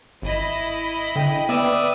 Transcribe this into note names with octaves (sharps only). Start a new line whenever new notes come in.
G#1 E4 D#5 B5
D3 G5
B3 B4 D5 E5 D#6